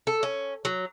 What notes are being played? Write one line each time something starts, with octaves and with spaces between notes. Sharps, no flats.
A4
C#4
F#3